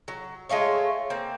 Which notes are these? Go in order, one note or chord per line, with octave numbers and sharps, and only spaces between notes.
F#3
G#3 A3 F4 C#5
A#3 C4